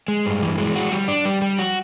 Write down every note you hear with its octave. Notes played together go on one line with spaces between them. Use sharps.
G#3
G2
E3
G#3
F#4
G3
D4
G3
G3
F#4